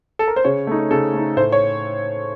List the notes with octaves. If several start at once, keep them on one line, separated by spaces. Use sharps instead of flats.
A4
A#4
C5
C#3 C#5
A3 D#4
C#3 A4
A3 D#4
A2 C5
C#5